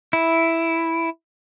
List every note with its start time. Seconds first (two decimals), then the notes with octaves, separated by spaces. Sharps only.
0.13 E4